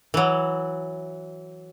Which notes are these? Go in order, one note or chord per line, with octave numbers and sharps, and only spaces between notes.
E3 F#3